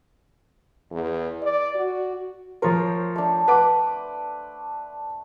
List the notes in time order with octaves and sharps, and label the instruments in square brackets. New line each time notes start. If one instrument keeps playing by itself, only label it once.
[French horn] E2
D5
F#4
[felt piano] F3 A#4 [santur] C5 C#5
[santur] A3 D4
[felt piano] B4 F#5 D6